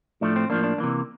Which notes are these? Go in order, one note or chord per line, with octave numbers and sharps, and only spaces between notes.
A2 F3 A3 D4
C4
A2 F3 A#3 D4
D4
C3 E3 A#3